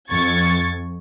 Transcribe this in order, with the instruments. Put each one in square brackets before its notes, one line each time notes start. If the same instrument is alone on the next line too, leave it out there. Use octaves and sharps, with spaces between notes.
[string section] F2 C#6 G#6 A6